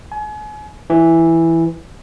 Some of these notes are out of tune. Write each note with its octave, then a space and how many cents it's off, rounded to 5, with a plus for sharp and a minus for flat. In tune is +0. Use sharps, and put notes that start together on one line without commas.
G#5 +35
E3 +0